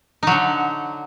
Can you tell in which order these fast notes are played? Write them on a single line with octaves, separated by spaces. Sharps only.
D#4 F#3 D3